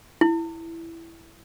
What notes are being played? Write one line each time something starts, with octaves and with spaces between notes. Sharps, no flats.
E4